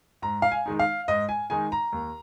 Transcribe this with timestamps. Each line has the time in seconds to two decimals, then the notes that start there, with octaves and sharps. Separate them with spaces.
0.22 G#2 A#5
0.42 F5
0.52 G#5
0.66 D#3 G#3 D#4
0.79 F5
1.08 G#2 D#5
1.29 G#5
1.50 D#3 G#3 D#4 G#5
1.72 A#5
1.92 D#2